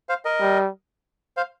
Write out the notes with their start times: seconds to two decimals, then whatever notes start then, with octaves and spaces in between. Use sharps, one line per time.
0.09 C5 F5
0.25 A#4 D#5
0.41 G3
1.37 C5 F5